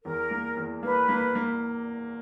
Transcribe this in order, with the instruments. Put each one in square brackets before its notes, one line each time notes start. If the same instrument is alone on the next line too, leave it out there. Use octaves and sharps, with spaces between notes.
[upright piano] E2 [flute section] A#4
[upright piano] A#3
E2
[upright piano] A#3 [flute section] B4
[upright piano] A#3
A#3